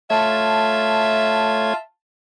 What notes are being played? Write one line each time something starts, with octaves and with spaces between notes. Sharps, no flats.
A3 F4 C#5 E5 A5 G#6